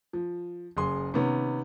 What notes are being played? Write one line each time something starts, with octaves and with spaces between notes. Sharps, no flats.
F3
F#1 G#4 C6
C3 D#3 B3 C#4